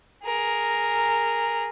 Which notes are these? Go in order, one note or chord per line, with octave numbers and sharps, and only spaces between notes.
G#4 A#4